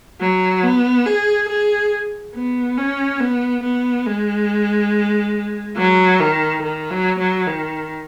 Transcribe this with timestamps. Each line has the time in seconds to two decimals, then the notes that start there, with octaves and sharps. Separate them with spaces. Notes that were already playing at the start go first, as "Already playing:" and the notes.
0.20 F#3
0.63 B3
1.06 G#4
1.49 G#4
2.35 B3
2.77 C#4
3.20 B3
3.63 B3
4.06 G#3
5.77 F#3
6.20 D#3
6.63 D#3
6.91 F#3
7.19 F#3
7.47 D#3